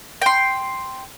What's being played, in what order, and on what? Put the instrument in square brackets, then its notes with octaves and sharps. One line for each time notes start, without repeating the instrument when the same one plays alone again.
[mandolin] G5 C6